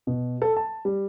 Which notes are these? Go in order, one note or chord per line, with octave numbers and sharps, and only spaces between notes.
B2
A4
A5
G3